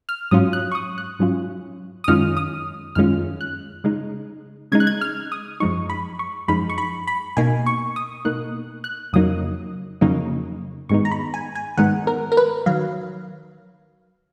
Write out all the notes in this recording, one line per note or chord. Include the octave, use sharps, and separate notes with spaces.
F6
G#2 F#3 C#4 F4 D#6
F#6
C#6
D#6
F#6
G#2 F#3 C#4 F4
D#6
F#2 D#3 G#3 C#4 F4 F6
D#6
F#2 D#3 G#3 C#4 F4 F6
F#6
C#3 G#3 D#4
C#3 G#3 D#4 G#6
F#6
G#6
F6
D#6
F#2 F3 G#3 D#4 C#6
B5
C#6
F#2 F3 G#3 D#4 B5
C#6
B5
B5
B2 A#3 D#4 G#5
C#6
D#6
B2 A#3 D#4 F#6
F#6
F2 C#3 F#3 A#3 D#4 D#6
F2 C#3 F#3 A#3 D#4
G#2 D#3 G#3 B3 D#4 C#6
A#5
B5
G#5
G#5
G#2 D#3 G#3 B3 D#4 F#5
A#4
A#4
B4
D#3 F#3 F5